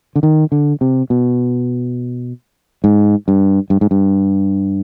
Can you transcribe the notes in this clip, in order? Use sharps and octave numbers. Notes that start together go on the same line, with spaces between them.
D3
D#3
D3
C3
B2
G#2
G2
G2
G#2
G2